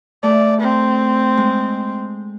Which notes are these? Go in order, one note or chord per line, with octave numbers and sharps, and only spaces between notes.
A3 D5
C4
G#3